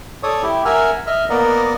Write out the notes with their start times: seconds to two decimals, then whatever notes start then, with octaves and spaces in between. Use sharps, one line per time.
0.23 A4 C#5 D5 C#6 D#6
0.43 E4 G4
0.65 A#4 E5 F#5 G#5 E6 F6
1.07 D#5 E5 F6
1.30 A#3 B3 A#4 D5 D#5 F#5